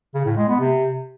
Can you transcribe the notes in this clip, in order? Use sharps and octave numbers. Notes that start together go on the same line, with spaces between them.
C#3
A2
G#3
B3
C3